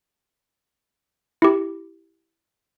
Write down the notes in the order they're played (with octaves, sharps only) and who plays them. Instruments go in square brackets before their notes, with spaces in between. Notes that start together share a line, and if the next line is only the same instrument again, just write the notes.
[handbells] E4 G4